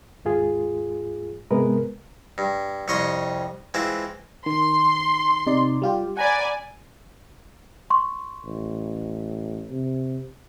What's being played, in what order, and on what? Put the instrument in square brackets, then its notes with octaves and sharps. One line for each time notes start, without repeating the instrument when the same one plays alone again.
[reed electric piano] D#2 G#2 F4 G#4
G#2 C3 G#3 B3 A#4 B4
[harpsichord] G2
C2 F2 C#5 D#5 C6 C#6
E3 G#3 C4 E4 F4
[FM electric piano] D#3 [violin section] C6
[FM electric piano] C3 D#4 D5
G3 F4 G4
[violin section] D5 G#5 [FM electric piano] F#5 A#5 B5
[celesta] C6 C#6
[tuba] A1
C3